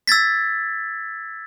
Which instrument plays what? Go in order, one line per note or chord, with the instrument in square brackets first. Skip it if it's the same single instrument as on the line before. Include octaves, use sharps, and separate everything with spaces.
[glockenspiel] E6 G#6 A6 B6